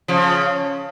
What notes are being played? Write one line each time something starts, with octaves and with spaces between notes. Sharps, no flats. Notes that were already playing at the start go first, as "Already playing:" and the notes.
C#3 F3